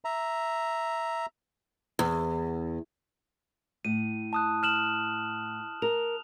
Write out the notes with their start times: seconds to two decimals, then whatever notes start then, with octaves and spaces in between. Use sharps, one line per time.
0.05 E5 A#5
1.99 E2
3.85 A2 D#7
4.33 A5 D#6 F#6
4.63 F6 E7 F#7
5.82 A#4 F7